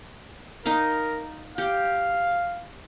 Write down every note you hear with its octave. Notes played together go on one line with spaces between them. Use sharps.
D#4 A#4 D#5 F5
G4 F5